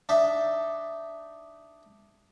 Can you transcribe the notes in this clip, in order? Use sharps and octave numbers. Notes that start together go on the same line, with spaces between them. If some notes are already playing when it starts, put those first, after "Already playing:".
D4 D#4 E5